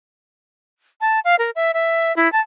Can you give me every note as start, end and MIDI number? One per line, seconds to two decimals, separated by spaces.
1.01 1.20 81
1.25 1.36 77
1.39 1.51 70
1.55 1.71 76
1.74 2.15 76
2.16 2.31 64
2.32 2.40 81